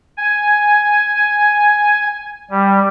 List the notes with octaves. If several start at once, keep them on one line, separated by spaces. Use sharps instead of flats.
G#5
G3